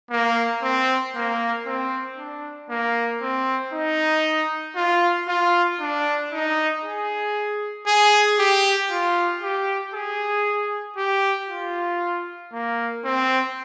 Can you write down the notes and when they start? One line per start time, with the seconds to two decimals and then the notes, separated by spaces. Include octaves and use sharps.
0.11 A#3
0.62 C4
1.15 A#3
1.66 C4
2.17 D4
2.70 A#3
3.21 C4
3.73 D#4
4.76 F4
5.28 F4
5.80 D4
6.32 D#4
6.84 G#4
7.87 G#4
8.39 G4
8.91 F4
9.43 G4
9.94 G#4
10.97 G4
11.48 F4
12.53 A#3
13.04 C4